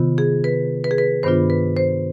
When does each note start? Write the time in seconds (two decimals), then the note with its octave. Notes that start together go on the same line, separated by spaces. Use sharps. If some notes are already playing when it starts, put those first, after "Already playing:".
Already playing: C3 D#3 B3 F4
0.18 G#4
0.44 B4
0.84 B4
0.91 G#4
0.98 B4
1.23 G2 D#3 B3 D4 F4 C5
1.50 B4
1.77 C5